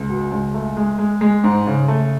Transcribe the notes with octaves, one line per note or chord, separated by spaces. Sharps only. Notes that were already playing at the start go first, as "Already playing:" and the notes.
Already playing: C#2
B2
C#2
A3
G#3
G#3
G#3
G#2
C#3
A3